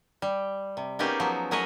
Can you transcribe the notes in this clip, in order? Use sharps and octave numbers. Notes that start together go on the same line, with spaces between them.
G3
C3
A#3 B3 C#4 D#4 G4 G#4
F3 F#3 B3
F#3 G#4 A#4 B4 C#5 D#5